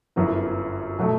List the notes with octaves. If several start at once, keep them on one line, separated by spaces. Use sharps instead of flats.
G1 F#2 F#3 B3 E4
B2 F#3 A3